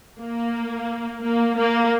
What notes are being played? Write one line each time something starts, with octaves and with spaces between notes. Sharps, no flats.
A#3
A#3
A#3